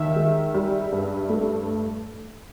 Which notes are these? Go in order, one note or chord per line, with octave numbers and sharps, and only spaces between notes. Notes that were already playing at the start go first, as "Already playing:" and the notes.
Already playing: D#2 D#3 E5
G#3
G3
G2
A3